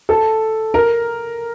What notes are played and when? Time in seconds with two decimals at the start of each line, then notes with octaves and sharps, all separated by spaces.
0.09 A4
0.74 A#4